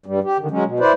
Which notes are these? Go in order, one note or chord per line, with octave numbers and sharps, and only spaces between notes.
G2 G3
G4
D3 D#3
F#3 G#3 C#4
B2
E4 B4 C5 D5